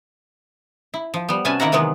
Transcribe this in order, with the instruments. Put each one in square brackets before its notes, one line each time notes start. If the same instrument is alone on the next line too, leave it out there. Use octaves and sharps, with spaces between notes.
[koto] E4
F3
G3 B3
C3 C#4 F#4 B4 G#5 A5
C3 D#3 A#3 E4 F#5 A#5
C3 D#3 E3 F#3 G#3 B3